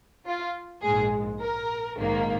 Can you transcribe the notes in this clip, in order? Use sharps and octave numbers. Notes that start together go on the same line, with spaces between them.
F4
A#1 G#2 G#3 G#4
A#4
A#1 G#2 D#3 A#3